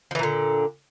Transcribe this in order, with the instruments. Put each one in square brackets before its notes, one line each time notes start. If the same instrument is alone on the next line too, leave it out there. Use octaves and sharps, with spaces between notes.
[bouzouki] F3
E3
A#2
D3